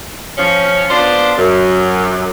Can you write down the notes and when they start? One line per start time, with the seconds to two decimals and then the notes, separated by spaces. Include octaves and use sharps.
0.37 F3 C#4
0.90 B3 D4 F4 C5
1.38 F#2